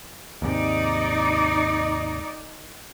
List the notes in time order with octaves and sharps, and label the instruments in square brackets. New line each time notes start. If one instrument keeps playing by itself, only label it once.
[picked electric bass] D#2 G#2 C3 [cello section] D#4 D5